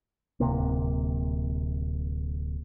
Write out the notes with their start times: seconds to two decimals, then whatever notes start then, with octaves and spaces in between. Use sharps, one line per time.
0.40 D1 F2 C3 A#3